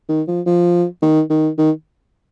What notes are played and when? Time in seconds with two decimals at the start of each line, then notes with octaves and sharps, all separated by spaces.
0.09 D#3
0.28 F3
0.46 F3
1.02 D#3
1.30 D#3
1.58 D#3